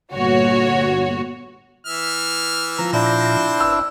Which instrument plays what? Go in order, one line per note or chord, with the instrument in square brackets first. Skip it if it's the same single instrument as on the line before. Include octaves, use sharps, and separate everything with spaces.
[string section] G1 A#2 F#4 C#5
[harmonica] E3 E5 F6
[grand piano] F3 [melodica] A#5
[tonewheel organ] A#2 [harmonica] C4 C5 [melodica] D4 E4
[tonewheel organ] G1 [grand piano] E6